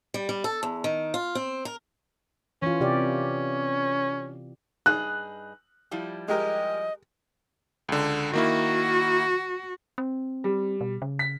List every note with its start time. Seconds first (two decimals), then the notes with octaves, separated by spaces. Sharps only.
0.14 G3
0.29 G3
0.44 A4
0.63 E2
0.84 D#3
1.14 F4
1.35 C4
1.65 A#4
2.62 E3 C#4 F4
2.81 C3 G4 D5
4.86 G2 D#4 G#4 F#6
5.91 F3 G3 E4
6.28 G#3 G4 A#4 D#5
7.89 C#2 D3
8.33 D#3 A#3 E4 F#4
9.98 C4
10.44 G3
10.81 B2
11.02 C#3
11.19 B6